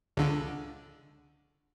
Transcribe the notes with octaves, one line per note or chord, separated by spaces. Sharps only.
C#2 D3